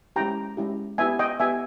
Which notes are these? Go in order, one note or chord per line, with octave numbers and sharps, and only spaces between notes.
G#3 C#4 E4 G4 G5 A#5
G#3 C#4 E4 G4
B3 E4 G4 E5 G#5
D#5 G5
B3 E4 G4 E5 G#5